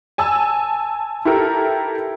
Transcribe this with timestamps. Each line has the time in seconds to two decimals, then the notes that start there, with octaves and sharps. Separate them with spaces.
0.18 G#5 A5 E6
1.25 E4 G4 A4 A#4